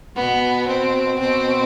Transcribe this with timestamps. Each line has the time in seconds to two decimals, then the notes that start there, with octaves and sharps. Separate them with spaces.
0.16 B2 B3
0.68 C4
1.20 B2 C4